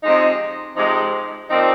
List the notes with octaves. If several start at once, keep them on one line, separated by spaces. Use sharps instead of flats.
C3 F3 G#3 D#4
C3 F3 G#3 D#4
A#2 F3 C4 D#4